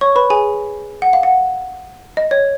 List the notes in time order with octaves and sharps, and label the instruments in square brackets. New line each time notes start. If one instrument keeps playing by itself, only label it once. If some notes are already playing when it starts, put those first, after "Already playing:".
[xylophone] C#5 C#6
B4 B5
G#4 G#5
F#5
F5
F#5
D#5
C#5